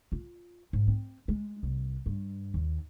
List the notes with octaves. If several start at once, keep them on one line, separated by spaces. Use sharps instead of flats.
F4
G#2
C4
G#3
C2
G2
D#2